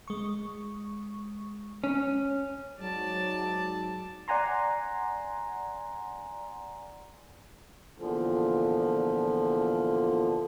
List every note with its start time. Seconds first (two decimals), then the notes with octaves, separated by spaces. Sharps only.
0.08 G#3 C#6
1.84 C#4
2.80 G#2 F#3 D5 A5
4.28 D5 F#5 G#5 A#5 C6
7.98 E2 A#2 D3 F3